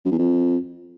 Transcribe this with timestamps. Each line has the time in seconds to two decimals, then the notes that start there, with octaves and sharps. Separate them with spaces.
0.05 F#2
0.12 E2
0.18 F2